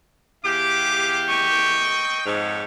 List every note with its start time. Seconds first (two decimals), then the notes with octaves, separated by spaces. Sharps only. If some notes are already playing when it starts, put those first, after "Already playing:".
0.44 E2 G4 G#4 F5 D6
1.29 C4 D#5 G5 C#6
2.25 F2 G#2 G4 A4 C#5